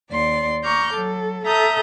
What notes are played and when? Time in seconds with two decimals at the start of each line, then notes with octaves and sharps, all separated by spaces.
0.10 D#2 D5 C6
0.64 A#5 C#6 D6 F6 G6
0.93 F#3 A4
1.44 A4 E5 A#5 D#6 G6